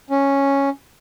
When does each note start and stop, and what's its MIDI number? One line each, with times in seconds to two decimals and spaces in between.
0.10 0.69 61